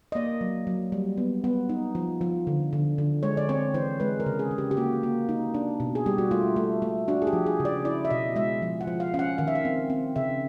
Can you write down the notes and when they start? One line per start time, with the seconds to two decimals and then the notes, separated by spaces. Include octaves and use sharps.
0.12 D#5
0.15 A#3 D5
0.41 F#3
0.67 F#3
0.92 G3
1.18 B3
1.44 B3
1.69 D#4
1.95 F3
2.21 F3
2.47 D3
2.73 D3
2.98 D3
3.23 G#3 C#5
3.37 D5
3.49 C4 C#5
3.74 E3 C5
4.00 G#3 B4
4.20 A#4
4.26 C#3
4.39 G#4
4.51 C#3
4.58 G4
4.71 G4
4.77 A#3 F#4
5.03 A#3
5.29 D#4
5.54 D4
5.80 B2
5.95 G#4
6.06 G3 G4
6.18 F#4
6.31 A3 F4
6.56 A3
6.82 A3
7.08 D4 F#4
7.22 G#4
7.27 G4
7.33 F3
7.46 G#4
7.60 C#3
7.65 D5
7.85 E4 D5
8.05 E5
8.10 B2 D#5
8.36 G#3 E5
8.62 F3
8.81 F#5
8.87 F3
9.00 F5
9.14 C#4 F5
9.19 F#5
9.38 D#3 F5
9.48 E5
9.55 F5
9.65 C4
9.90 C4
10.16 C#3 E5